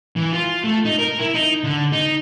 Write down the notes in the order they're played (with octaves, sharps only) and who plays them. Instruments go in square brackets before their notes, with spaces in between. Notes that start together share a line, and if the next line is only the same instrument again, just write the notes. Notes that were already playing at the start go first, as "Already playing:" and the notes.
[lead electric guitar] E3
F4
A3
D#4
A#4
E4
D#4
D3
D#4